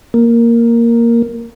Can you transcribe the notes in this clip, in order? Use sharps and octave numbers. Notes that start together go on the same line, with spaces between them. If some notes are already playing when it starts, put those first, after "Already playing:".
A#3